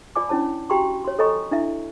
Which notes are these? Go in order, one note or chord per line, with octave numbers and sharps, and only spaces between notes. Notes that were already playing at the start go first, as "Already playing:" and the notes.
F4 D5 G#5 D6
C#4 D4 E4 C#5 A5
F#4 G4 G5 A#5 C6 C#6
C#5 C6
A4 C#5 D#5 G#5 A#5 C#6
D4 E4 E5